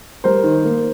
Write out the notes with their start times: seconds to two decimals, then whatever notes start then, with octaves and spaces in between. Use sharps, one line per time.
0.24 G3 A#4 C5
0.44 D#3
0.64 A#3